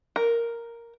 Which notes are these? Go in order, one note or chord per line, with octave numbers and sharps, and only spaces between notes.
A#4